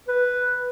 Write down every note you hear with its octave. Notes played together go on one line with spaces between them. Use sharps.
B4